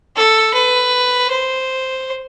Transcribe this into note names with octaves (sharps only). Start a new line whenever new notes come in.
A4
B4
C5